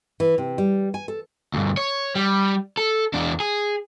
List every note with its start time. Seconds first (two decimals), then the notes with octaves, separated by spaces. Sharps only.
0.20 E3
0.38 C3
0.58 G3
0.94 G#5
1.08 A4
1.54 D2 G2
1.77 C#5
2.15 G3
2.77 A4
3.14 E2 D4
3.40 G#4